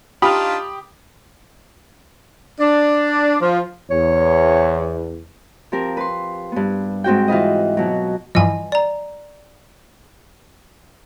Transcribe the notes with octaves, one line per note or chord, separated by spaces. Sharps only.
D4 D#4 F4 G4 B5 D#6
D4
F3
E2 C#5
F3 C4 G4 A#4
B4 C6
G2 B3
G#2 C4 F#4 G5
E3 F4 B4 D#5
B2 F#3
G2 E3 F3 D#5 G#5
D5 A#5